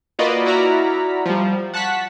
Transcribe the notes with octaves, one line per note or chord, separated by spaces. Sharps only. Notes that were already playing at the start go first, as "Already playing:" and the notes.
A#3 F4 F#4 B4 D5 D#5
E4 F#4 D5 A#5 F6 B6
F3 G3
F#5 A5 C#6 F#6 B6